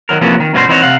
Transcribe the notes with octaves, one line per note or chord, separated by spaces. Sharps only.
D#3 E3 F#3 A#4
C3 E3 F3 A#3 B3 C#4
D#3
G2 B2 C#4 F#4 G4 C5
E3 C4 D#4 F#4 C5 C#5
C3 F5 F#5